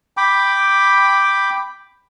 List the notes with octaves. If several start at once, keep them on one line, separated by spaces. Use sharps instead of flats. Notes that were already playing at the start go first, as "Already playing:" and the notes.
G5 B5 D6